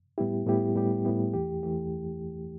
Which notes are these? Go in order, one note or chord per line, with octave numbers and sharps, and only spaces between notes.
A2 G3 B3 E4 G4
A2 G3 B3 E4 G4
A2 G3 B3 E4 G4
A2 G3 B3 E4 G4
E2 E3 A3 G4
E2 E3 A3 G4